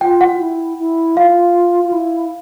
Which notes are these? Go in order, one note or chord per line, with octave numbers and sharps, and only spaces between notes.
F4 G5
F#5
F4
E4
E4
F4 F5
F4
E4